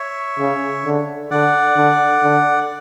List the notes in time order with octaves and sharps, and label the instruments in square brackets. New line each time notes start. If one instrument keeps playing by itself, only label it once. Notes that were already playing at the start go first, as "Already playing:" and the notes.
Already playing: [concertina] C#5 E5
[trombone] C#3
D3
[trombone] D3 [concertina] D5 F#5
[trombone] D3
D3